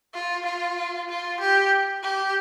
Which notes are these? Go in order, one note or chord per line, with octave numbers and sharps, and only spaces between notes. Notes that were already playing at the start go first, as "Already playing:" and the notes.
F4
F4
F4
G4
G4